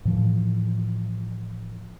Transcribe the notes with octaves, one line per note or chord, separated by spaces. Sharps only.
A2 E3 F3